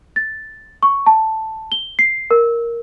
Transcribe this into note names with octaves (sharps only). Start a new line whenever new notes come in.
A6
C#6
A5
G7
C7
A#4